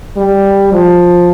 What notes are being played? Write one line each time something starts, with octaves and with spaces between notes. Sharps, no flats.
G3
F3